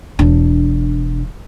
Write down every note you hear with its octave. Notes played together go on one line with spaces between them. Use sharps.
E1 D4